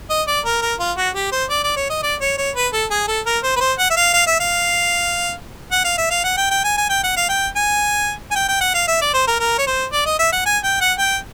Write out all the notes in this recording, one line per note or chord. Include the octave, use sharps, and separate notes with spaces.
D#5
D5
A#4
A#4
F4
F#4
G4
C5
D5
D5
C#5
D#5
D5
C#5
C#5
B4
A4
G#4
A4
A#4
C5
B4
C5
F#5
E5
F5
F5
E5
F5
F#5
F5
E5
F5
F#5
G5
G5
G#5
G#5
G5
F#5
F5
G5
G#5
G#5
G5
G5
F#5
F5
E5
D5
C5
A#4
A#4
C#5
C5
D5
D#5
E5
F#5
G#5
G5
F#5
G5